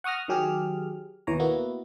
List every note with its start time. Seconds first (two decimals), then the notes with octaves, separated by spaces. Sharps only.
0.04 F#5 C#6 D#6 F6 A#6
0.28 D#3 F#3 G4 G#4 F6
1.27 D#2 B2 E3 C#5 A#5
1.39 A#3 B3 E4 F#4